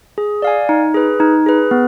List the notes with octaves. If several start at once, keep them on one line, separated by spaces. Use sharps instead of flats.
G#4
D5 F5 G#5
D#4
G#4 B4
D#4
G#4 B4
B3